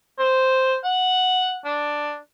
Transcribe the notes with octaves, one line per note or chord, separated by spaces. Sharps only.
C5
F#5
D4